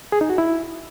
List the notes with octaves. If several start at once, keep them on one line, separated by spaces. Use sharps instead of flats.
G#4
D#4
F#4
E4